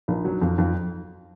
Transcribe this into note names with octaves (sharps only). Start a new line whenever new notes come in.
A#1
F#3
F2
F2